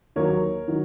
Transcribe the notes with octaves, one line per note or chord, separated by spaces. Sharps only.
D#2 D#3 F#3 A#4 C#5
D#3 F#3